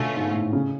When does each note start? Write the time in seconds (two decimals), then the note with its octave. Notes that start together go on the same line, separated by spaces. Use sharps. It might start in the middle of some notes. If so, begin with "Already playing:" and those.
Already playing: B2 D3 A3 C#4 F4
0.16 G#2
0.34 A2
0.53 C#3